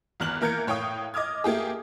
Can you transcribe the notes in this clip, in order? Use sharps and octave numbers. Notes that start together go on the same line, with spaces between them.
G#1 E2 F6 F#6 F#7
E3 A#3 A#4 G6 G#6 C#7
A2 C#5 F5 G5 C#6 D#6
D#5 D6 D#6 F6 G#6
A3 A#3 G4 G#4